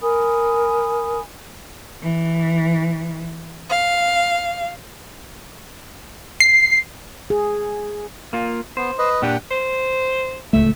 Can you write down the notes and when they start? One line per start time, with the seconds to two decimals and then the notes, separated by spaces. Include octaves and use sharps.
0.02 A#4 G#5 B5 D#6
2.01 E3
3.70 F5
6.40 C7
7.30 G#4
8.33 A#3 F4
8.77 B3 C5
8.99 B4 D#5
9.22 A#2 D4 G4 F#5 G5
9.51 C5
10.53 D1 C#2 A3 E5